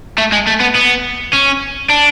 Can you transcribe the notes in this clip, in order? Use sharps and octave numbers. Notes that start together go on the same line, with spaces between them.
A3
G#3
A3
B3
B3
C#4
D4